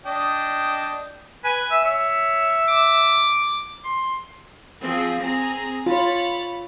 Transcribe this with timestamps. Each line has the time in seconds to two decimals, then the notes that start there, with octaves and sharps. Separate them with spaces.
0.05 D4 D#5 G5
1.44 B4 G#5
1.71 E5
1.84 C#5 E5
2.68 D6
3.85 C6
4.82 F3 C4 G#4
5.21 C4 G#4 A#5
5.86 F4 C#5 B5 A6